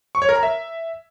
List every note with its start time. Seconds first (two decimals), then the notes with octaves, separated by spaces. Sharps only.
0.15 C#6
0.22 C#5
0.29 A#4
0.36 A#5
0.43 E5